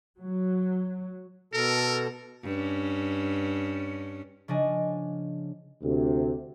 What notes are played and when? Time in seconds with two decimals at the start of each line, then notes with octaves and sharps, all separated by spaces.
0.17 F#3
1.53 B2 A4 A#4
2.44 G2 C#4
4.48 C#3 F3 D4 D#5 G#5
5.83 D2 C3